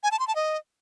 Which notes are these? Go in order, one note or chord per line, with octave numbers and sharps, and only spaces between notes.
G#5
A5
C6
A5
D#5